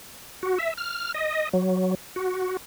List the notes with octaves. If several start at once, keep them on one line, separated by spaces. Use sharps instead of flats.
F#4
E5
F6
D#5
F#3
F#4